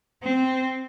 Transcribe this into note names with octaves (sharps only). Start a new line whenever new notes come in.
C4